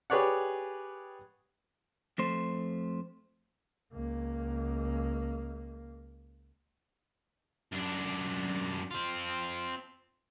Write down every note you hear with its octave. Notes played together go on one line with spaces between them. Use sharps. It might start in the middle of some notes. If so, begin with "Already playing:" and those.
G4 G#4 B4 C#5 D5 F#5
F2 A3 C5
C#2 A#3
F#2 D4
C4 F4